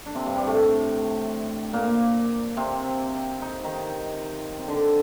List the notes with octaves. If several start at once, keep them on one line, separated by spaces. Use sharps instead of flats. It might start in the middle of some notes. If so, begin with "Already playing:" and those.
D4
C3 C4
G2 G3
G2 G3
A2 A3
A#2 A#3
C3 C4
D#4
D#3 D#4
C4
D3 D4